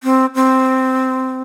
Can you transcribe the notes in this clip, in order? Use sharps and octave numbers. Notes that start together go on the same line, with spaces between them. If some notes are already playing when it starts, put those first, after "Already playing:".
C4
C4